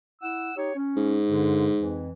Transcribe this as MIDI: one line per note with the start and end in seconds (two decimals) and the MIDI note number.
0.22 0.51 64
0.22 0.51 78
0.22 0.51 88
0.57 0.71 63
0.57 0.71 67
0.57 0.71 73
0.75 1.17 61
0.96 2.05 44
1.29 1.69 43
1.29 1.69 50
1.76 2.11 41
1.76 2.11 52